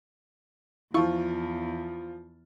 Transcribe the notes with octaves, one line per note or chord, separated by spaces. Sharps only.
E2 F3 E4 F4 C#6